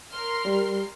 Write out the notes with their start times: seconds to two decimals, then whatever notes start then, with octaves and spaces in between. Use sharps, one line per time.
0.12 A#4 C6 F6
0.45 G3